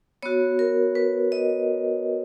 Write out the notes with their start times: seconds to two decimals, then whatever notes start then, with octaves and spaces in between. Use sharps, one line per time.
0.23 B3 F#4 C#5
0.59 A#4
0.95 B4
1.32 D#5